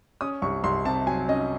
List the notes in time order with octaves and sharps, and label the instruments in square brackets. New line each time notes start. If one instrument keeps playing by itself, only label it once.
[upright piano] C#4 D#6
C2 C#6
C2 C6
C3 A5
F#3 G#5
C#4 D#5